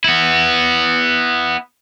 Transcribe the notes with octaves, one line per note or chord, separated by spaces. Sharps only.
B3 E4